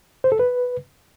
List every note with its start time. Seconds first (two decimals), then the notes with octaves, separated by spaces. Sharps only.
0.24 C5
0.32 A4
0.39 B4